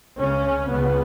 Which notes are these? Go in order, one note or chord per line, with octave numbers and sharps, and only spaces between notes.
C#2 C#3 C#4
C#2 C#3 B3